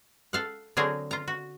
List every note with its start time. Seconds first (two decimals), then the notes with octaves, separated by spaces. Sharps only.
0.33 A4 F5 F#5
0.77 D3 F#3 C4 G#4 A#4 C#5
1.11 F4 A#5
1.28 F#4